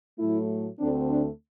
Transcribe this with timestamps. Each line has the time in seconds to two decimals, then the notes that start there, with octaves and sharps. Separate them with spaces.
0.19 A2 F#3 A3 E4
0.79 D2 D3 A3 C4 D4
1.10 D4